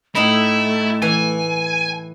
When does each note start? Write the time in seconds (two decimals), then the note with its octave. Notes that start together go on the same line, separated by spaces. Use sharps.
0.15 A2 A3 D#4 E4 B5
1.02 E3 G#5